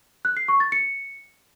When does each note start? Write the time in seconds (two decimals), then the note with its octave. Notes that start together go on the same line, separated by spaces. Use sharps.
0.25 F#6
0.37 C7
0.48 C#6
0.60 A6
0.72 C#7